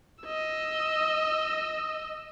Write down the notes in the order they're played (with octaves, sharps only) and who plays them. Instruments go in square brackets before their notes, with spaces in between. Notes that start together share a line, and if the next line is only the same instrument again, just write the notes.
[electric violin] D#5 E6